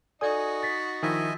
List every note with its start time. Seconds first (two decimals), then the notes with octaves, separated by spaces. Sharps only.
0.21 D#4 F#4 A4 D5 G#5 D#6 G#6
0.63 A6 B6
1.03 D#3 F3 E4 D#5 E5 G#5